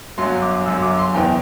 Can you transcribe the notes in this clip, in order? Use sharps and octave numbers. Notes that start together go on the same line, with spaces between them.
G1 F#2 F#3 C6
D6
G1 F#2 F#3 E6
D6
C6
E2 C3 E3 G5